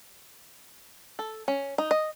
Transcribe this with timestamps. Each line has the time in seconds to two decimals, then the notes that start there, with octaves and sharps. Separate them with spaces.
1.19 A4
1.48 C#4
1.78 D#4
1.91 D#5